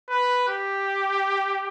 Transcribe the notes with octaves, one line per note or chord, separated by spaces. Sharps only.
B4
G4